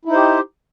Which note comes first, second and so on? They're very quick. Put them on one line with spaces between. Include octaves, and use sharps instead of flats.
E4 D#4 C5 G4